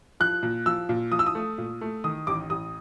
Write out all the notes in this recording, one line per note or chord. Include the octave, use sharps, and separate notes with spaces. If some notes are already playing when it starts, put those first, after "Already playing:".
F3 F#6
A#2
F3 E6
A#2
F3 D#6
E6
D#6
A3
A#2
A3
D#3 D#6
A1 D6
A1 D#6